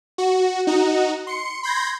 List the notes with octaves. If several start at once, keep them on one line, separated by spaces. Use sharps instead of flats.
F#4
D#4 F#4
C6 C#7
B5 C6 G6 G#6 A#6